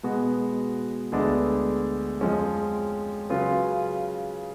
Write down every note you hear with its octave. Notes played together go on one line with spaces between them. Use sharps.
B2 G#3 B3 F#4
D2 D3 G#3 B3 D4
F2 F3 G#3 C#4
C#3 F#3 C#4 F4 B4